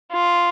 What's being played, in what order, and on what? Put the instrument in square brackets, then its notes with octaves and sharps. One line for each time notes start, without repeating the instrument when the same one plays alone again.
[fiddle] F4